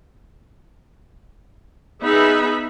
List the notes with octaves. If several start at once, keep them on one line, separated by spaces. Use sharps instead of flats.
B3 D#4 G#4 E5 B5